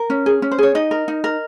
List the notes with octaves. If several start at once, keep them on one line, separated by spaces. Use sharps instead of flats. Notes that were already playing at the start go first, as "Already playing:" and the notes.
Already playing: A#4
C#4
G#4
C#4
C5
G#4 C#5
D#4 D#5
A#4
D#4
A#4